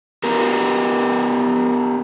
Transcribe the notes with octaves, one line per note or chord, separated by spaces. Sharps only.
B3 G4 A#4